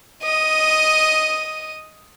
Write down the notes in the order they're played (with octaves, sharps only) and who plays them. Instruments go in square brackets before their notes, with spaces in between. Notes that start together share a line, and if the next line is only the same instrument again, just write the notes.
[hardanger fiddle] D#5 D#6